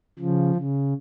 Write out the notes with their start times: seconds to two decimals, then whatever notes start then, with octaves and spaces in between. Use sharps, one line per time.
0.19 C#3 F3
0.55 C#3